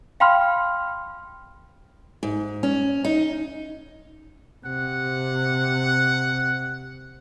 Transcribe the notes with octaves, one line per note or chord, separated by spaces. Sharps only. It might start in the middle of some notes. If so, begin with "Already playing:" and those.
F5 G5 B5 C6 F6
G#2
C#4
D#4
C3 F#5